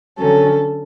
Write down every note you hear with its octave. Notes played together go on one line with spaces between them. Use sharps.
D3 F#3 C#4 A4